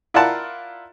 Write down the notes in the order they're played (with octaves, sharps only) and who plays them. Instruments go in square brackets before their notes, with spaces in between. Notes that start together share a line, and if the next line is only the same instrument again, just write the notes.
[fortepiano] E4 F4 A#4 D5 F#5 A5